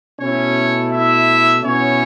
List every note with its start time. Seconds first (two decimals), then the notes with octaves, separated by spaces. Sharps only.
0.19 B2 A3 C#4 E4 C#5
0.91 E4 E5
1.63 B2 B3 C#4 E4 C#5